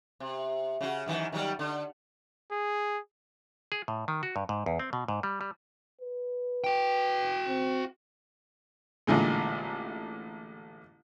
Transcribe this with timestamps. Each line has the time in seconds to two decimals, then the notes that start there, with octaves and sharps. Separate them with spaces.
0.20 C3
0.81 C#3 F#4
1.06 F#2 D#3 E3
1.32 D#3 F#3 G3
1.59 D3
2.51 G#4
3.72 G#4
3.88 A2
4.08 D#3
4.23 F#4
4.36 G2
4.49 G#2
4.66 E2
4.79 C4
4.93 B2
5.08 G#2
5.23 G3
5.41 G3
6.01 B4
6.64 F#4 G5
7.48 C4
9.07 A1 A#2 D3 G#3